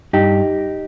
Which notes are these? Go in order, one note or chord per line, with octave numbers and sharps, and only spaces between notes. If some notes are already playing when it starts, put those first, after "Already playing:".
G2 D#4 G4